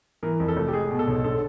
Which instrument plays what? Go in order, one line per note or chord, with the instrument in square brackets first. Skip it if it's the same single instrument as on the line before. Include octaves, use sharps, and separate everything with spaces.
[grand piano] E3 A#4
F2
A4
F1
G4
G#3 G#4
B2
A4
B1
D3 A4